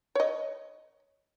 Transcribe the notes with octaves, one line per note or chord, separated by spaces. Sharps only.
C#5 D#5